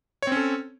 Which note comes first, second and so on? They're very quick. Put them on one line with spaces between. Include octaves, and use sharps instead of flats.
C#5 C4 C#4 A4